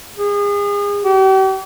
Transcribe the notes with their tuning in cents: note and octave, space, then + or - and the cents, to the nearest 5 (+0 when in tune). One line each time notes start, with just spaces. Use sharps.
G#4 -35
G4 -40